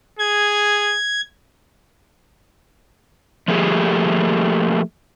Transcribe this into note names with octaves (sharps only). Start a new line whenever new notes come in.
G#4 G#6
F3 A3 A#3 G4 G#4